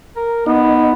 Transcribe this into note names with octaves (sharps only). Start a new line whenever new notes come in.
A#4
B3 D#4